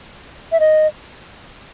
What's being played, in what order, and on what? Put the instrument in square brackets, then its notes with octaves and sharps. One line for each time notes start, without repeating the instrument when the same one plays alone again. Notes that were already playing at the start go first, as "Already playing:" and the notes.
[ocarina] E5
D#5